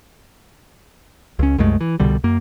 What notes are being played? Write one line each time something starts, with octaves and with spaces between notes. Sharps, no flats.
C#2 C#4
C2 F#2 G#3 A3
E3
C2 B2 D3 G3
F#2 A#3